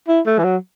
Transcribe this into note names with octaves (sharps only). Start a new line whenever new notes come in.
E4
A3
E3
F#3